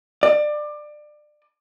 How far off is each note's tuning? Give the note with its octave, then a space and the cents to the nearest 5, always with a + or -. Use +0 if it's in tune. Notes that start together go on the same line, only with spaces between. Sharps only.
D5 +25